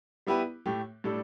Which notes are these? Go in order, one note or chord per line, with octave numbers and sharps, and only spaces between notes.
G3 B3 E4 G4 B4
A2 A3 G4
A2 G3 D4 A4